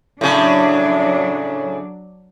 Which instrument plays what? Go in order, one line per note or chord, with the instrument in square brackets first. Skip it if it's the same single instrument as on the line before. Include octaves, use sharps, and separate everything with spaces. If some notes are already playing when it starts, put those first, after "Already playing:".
[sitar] A2 C#3 [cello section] F#3 D4